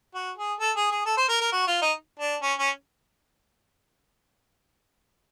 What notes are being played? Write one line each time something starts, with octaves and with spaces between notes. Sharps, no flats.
F#4
G#4
A4
G#4
G#4
A4
C5
A#4
A#4
F#4
F4
D#4
D4
C#4
C#4